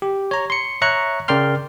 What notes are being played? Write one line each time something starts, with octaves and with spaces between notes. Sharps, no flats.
G4
C#5 A#5
C6 C#7
C#5 E5 A#5 C#6 F#6 C#7
C#3 A#4 D5 G5 C6 F6